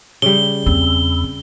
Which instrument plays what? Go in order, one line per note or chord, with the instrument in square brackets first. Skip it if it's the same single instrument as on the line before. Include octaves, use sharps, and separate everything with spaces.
[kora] C#3 G3 [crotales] G7
[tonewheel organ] E2 [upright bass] C4